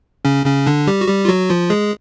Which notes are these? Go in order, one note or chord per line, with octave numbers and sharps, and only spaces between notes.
C#3 C#4
C#3 C#4
D3 D4
G3 G4
F#4
G3 G4
F4
F#3 F#4
F3 F4
G#3 G#4